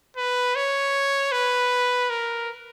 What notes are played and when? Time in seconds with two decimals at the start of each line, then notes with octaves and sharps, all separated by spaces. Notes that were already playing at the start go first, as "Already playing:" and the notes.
0.16 B4
0.55 C#5
1.32 B4
2.10 A#4